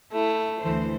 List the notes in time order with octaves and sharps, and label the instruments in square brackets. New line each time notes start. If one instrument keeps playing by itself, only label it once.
[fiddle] A3 [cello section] E4
[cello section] D2 E3 C5